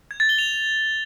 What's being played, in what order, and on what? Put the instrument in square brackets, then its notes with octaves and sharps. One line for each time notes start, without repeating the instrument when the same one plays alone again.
[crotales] G#6
A6
G7
F7